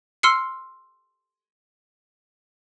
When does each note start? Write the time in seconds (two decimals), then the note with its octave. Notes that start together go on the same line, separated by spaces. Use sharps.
0.23 C6 E6 F6 C7 C#7